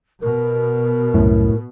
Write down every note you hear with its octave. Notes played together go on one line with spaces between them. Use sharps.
B2 A#4
C2 F#2 A2